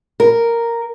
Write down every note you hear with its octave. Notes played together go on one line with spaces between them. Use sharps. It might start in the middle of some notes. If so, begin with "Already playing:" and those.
A#4